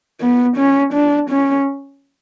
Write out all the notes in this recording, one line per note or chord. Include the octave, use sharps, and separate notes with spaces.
B3
C#4
D4
C#4